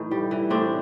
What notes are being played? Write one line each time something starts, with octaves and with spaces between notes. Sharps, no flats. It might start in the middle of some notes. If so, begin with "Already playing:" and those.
Already playing: A2 E3 D#4
G3
E3
A2 C4 D4